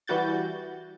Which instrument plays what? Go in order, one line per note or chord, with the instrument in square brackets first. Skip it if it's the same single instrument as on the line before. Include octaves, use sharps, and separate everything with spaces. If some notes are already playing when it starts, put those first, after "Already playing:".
[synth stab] E3 G3 F#4 G6 A6